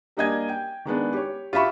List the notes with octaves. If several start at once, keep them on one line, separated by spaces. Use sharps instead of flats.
G3 A#3 D4 D#5 G#5 G#6
G5
D#3 G#3 B3 D4
G4 C#5
F4 G4 E5 B5 C#6